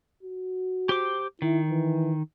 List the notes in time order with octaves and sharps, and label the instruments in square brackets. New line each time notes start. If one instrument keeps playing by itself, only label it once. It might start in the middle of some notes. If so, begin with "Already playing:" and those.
[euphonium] F#4
[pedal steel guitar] G4 C5 D6
[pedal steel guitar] D#3 [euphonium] E4
[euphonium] E3